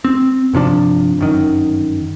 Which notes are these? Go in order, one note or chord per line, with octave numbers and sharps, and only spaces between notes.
C4
G1 C3 F3 D4
G1 F#2 D#3